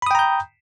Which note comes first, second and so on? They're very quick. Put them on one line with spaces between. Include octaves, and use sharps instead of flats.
B5 D#6 G5 A#5 G6